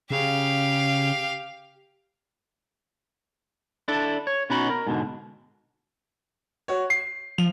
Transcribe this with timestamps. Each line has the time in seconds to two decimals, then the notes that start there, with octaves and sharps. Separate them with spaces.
0.10 C#3 G4 F5
3.88 D4 E4 A4
4.27 C#5
4.50 B2 B3 C#4 D#4 F#4 B5
4.70 A#4
4.87 G#2 B2 D3
6.68 F#4 C#5
6.90 C7
7.38 F3 F7